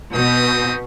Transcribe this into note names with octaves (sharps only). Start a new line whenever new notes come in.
B2 C4 D#4 D#6